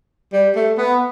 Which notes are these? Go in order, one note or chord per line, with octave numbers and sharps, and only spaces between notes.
G3
A3
B3